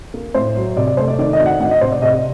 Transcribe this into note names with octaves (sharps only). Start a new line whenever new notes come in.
A#3
A2 C5
F#3
C3 D5
D5
A3 C5
D5
D#3 D5
D#5
D2
F#5
D2 F#5
D#5
C3 C5
D5
C3 D#5